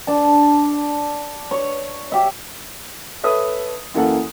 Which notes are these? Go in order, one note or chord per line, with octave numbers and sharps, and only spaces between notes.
D4 A5
C#5
G4 E5
A4 B4 C#5 E5 D#6
F#2 E3 A#3 A4 F#5